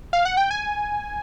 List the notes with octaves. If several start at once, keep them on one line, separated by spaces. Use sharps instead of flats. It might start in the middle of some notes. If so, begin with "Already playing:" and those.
F5
F#5
G5
G#5